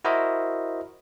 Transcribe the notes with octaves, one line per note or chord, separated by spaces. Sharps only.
E4 F#4 A#4 C5 D#5 E5